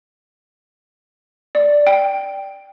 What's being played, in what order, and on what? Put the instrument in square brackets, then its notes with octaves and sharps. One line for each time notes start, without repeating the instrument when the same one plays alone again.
[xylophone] D5
G5